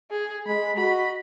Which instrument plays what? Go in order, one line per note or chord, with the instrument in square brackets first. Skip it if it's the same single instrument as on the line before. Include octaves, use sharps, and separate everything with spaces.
[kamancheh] G#4
[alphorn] G#3 [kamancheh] B5
[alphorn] F#4 [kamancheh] D#5 B5